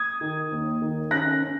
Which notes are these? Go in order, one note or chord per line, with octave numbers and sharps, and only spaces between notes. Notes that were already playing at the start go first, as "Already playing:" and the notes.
Already playing: D#6 G#6
D#3
D#2
D#3
C#4 F#6 A#6
C#4